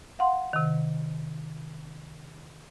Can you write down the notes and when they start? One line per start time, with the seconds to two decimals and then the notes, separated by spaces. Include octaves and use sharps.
0.19 F5 F#5 C6
0.53 C3 D#3